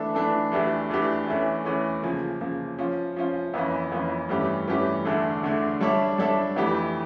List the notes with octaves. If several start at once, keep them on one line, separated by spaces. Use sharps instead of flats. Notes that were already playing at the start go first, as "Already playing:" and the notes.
Already playing: E3 A3 D4 A4
E3 A3 D4 A4
E2 E3 A3 D4 G4
E2 E3 A3 D4 G4
E2 E3 A3 C#4
E2 E3 A3 C#4
C#3 F3 A#3
C#3 F3 A#3
F3 C#4 F4
F3 C#4 F4
F2 E3 A#3 C#4 F4
F2 E3 A#3 C#4 F4
G2 E3 A3 C#4 G4
G2 E3 A3 C#4 G4
E2 D3 A3 D4
E2 D3 A3 D4
G3 D4 A4 C#5 E5
G3 D4 A4 C#5 E5
F2 E3 A3 E4 G4